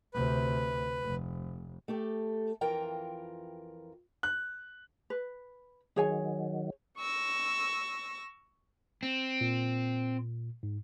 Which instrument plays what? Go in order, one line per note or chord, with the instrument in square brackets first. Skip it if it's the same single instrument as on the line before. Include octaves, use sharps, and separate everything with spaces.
[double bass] D2 C3 [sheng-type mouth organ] B4
[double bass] F1
[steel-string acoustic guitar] A3 G4 A4
F2 E3 F4 A#4 G5 A#5
[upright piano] F#6
[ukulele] B4
[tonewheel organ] D#3 F#3 [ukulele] G#4 C#5 G#5
[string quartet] C#6 E6 A#6
[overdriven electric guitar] C4
[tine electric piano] A#2
G#2